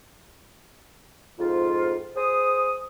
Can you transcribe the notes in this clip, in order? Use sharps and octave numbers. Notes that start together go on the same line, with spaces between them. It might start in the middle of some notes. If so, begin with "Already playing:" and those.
F2 G#2 F4
G#4 C5 D#6